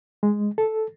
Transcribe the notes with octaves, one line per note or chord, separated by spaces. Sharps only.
G#3
A4